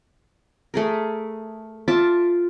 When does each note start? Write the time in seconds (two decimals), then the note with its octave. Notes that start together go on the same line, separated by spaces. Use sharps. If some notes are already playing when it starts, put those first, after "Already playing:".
0.74 A3 G#4 A#4
1.88 F4 E5 A5 D6